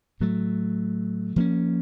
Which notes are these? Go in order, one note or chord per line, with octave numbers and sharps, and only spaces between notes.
A2 F#3 A3
F3 A#3 C#4